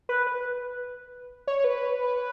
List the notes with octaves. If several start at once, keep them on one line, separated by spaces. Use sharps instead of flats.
B4
B4
C#5
B4